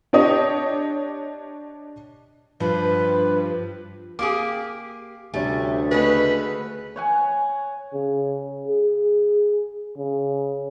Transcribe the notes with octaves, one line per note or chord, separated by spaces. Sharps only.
D4 G4 C#5 D#5
G2 F3 B4
A#3 G4 G#4 D6
D2 C3 G3 A3 C#4
C#3 G#3 A3 B3 G#4 B4
C#5 F#5 G#5
C#3
G#4
C#3